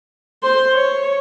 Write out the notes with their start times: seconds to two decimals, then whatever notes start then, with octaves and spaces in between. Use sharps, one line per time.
0.43 C5 C6
0.73 C#5